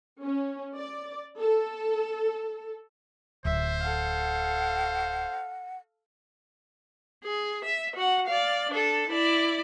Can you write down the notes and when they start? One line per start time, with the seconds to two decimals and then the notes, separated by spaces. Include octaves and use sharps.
0.24 C#4
0.76 D5
1.40 A4
3.45 D1 C5 E5
3.82 A4 F5 F#5
7.24 G#4
7.64 E5
7.96 F#4 F#5
8.27 D5 F5
8.70 D4 A4
9.09 E4 D5